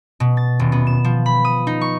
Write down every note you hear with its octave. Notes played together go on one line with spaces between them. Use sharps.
B2
A6
D#1
B3
E7
F3
B5
D#6
D#4
C#6